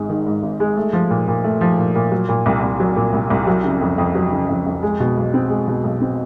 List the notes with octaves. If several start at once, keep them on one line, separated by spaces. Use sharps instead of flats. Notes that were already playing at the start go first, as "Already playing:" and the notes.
Already playing: G#1 G#2 G#3
D#3
G#2
G#1
G#3
A3
F3
A#2
A#2
A3
F3
A#2
A#2
F#3
A#2
C2
C2
F#3
A#2
C2
C2
F#3
C#3
F2
F2
F#3
C#3
F2
F2
G#3
B2
B1
C4
G#3
B2
B1
C4